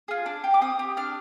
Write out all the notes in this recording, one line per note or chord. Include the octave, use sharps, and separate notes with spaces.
F4 G#4
D4
G4
D6
C4 D#6
G4
D4 F6